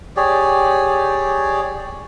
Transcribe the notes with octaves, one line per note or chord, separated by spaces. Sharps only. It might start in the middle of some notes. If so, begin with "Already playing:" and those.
G4 G#4 C#5 D5